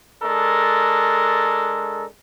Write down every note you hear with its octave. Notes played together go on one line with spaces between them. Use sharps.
G#3 D4 A4 A#4